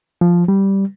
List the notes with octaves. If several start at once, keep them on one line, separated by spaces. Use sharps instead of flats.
F3
G3